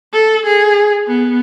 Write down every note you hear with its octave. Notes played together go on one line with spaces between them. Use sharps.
A4
G#4
B3